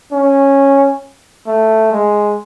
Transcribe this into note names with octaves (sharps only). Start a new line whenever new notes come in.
C#4
A3
G#3